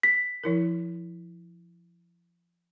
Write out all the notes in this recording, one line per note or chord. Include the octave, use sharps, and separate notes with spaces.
B6
F3 E4 A#4